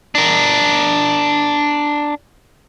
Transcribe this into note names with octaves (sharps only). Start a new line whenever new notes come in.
D4 A#4